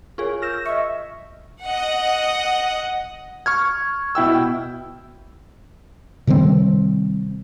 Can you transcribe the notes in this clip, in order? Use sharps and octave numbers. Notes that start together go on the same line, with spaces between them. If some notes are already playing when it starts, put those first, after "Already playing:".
F4 G#4 A#4 C#5 G#5 C#6
C#6 E6 F6 G6 A#6 E7
D#5 E5 C#6 C#7
D#5 F#5
C#6 F6 G#6
B2 E4 G5 E6
C3 D#3 G3 C4